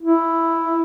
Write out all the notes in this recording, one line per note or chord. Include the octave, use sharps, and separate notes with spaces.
E4